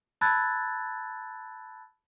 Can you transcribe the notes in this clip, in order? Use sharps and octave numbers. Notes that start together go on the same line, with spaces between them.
A5 B5 E6 F#6 G#6 A6